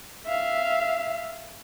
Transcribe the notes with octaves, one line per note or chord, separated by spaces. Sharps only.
E5 F5